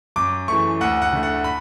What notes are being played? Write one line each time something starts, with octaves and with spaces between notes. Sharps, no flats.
F#2 D6
E3 A3 C#6
D2 F#5
F#5
D3 A3
F#5
B5